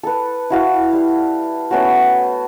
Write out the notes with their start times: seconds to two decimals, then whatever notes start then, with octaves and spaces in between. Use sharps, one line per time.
0.03 A4 B4
0.50 E4 F#4 F5
0.93 G3
1.71 A3 B3 C#4 F#4